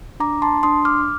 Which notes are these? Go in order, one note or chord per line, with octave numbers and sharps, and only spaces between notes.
D4 A#5 D6
A5 C6
D4 C6 D#6
D6 F6